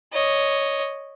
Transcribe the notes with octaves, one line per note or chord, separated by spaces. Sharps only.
C#5 D#5